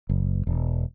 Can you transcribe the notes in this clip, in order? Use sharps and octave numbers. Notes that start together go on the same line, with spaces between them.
F#1
E1